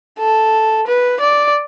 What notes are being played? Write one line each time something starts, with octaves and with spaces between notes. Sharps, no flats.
A4
B4
D5